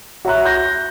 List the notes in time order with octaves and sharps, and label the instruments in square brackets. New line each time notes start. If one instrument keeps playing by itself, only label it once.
[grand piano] F#4 C#5 E5 A#5 C#6 F#6
G6 A#6